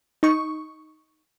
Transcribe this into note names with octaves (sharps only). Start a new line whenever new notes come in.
D#4 C#6